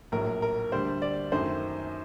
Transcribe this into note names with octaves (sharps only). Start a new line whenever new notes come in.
A#1 A2 F#3 A#4
A#4
D2 D3 G3 D4 C5
D5
F#2 D#3 A3 C5